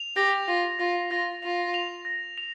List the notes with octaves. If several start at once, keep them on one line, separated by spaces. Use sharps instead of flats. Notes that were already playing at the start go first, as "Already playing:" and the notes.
Already playing: F7
G4 A#6
F4 A#6
F4 A#6
F4 A#6
F4 F7
F7
A#6
F7